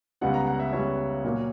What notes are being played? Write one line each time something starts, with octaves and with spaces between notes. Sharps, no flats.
C#2 C#3 G3 B3 F#5
A#5
F#5
E5
C#2 C#3 G3 B3 C#5
A#2 F#3 A#3